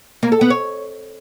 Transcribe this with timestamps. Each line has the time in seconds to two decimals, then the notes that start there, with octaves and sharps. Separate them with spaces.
0.23 A#3
0.32 A4
0.41 B3
0.50 C#5